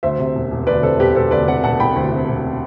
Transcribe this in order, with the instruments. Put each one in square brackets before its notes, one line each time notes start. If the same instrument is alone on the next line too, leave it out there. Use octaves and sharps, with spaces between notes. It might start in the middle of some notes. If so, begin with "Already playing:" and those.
[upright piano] D2 C5 E5
C3
E1
E1
D2 B4 D5
C3 A4 C5
E1 G4 B4
E1 A4 C5
D2 B4 D5
C3 D5 F#5
E1 F#5 A5
E1 G5 B5
D2
C3
E1